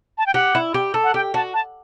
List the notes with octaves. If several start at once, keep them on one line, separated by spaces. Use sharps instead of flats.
A5
G5
G4 F#5
E4
G4
A4
F#5
G4 G5
F#4 A5
A5